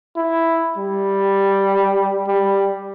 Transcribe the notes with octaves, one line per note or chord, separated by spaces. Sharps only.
E4
G3
G3